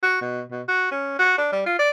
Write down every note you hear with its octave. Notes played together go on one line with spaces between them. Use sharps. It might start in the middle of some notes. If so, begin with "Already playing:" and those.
F#4
B2
B2
F#4
C#4
F#4
D4
G3
F4
D5